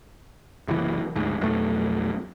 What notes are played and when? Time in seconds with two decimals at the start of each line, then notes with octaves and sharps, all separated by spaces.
0.68 F#1 C2 E3
1.16 D2 G#2
1.41 B1 F2 A3